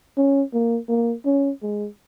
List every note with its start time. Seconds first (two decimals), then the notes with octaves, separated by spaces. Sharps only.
0.17 C#4
0.54 A#3
0.89 A#3
1.26 C#4
1.63 G#3